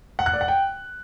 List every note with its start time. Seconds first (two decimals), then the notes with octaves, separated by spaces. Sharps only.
0.19 F#5
0.26 F#6
0.34 D5
0.41 F#5
0.48 G5